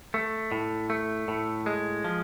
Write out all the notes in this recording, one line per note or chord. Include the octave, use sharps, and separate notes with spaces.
A3
A2
A3
A2
G#3
F3